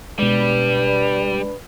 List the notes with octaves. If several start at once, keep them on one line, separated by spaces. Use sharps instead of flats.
B2 G3 G#3 D4 B4